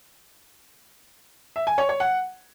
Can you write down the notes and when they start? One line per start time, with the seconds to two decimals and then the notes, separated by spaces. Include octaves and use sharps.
1.56 E5
1.67 G#5
1.78 C#5
1.89 C#5
2.00 F#5